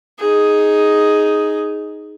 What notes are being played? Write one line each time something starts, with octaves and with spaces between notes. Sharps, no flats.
D#4 G#4